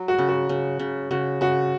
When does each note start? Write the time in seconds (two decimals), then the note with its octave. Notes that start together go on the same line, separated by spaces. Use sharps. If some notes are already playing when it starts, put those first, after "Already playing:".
Already playing: F#3
0.08 F#4
0.18 C#3
0.29 F#4
0.49 C#3
0.79 C#3
1.11 C#3 F#4
1.41 C#3 F#4